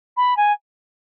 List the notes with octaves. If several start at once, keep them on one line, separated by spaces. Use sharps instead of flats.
B5
G#5